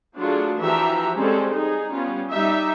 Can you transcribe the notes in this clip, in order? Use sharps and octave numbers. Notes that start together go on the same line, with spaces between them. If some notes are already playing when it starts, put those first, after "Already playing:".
F#3 A3 D4 F4 F#4 G#4
E3 F3 F#4 G4 E5 A#5
G3 G#3 C4 C#4 A4
D#4 G#4
G3 B3 C#4 F4
G3 D#4 E5